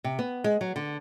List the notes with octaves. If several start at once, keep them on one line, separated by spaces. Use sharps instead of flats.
C3
B3
G#3
F#3
D3